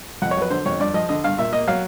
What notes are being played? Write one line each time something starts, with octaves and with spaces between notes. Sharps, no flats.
F2 F#5
C#5
F#3 B4
D3 C5
F2 C#5
G2 D5
F3 D#5
D3 D#5
G2 F5
A#2 E5
A#3 D#5
F#3 F5